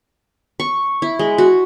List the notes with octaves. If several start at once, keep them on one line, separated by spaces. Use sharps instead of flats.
C#6
E4
G#3
F#4